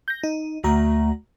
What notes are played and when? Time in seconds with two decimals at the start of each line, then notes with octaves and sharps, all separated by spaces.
0.08 G6 A#6
0.23 D#4
0.64 D2 A3 F#4 A#5